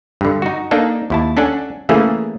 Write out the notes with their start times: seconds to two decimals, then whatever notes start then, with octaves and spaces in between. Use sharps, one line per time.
0.21 G2 D3
0.42 D#4 F#4
0.71 A#3 D4 D#4 A4
1.10 D#2 E4 A5
1.37 C#4 D4 A4 F#5 G#5
1.89 C#3 E3 A3 A#3 C#4 G#4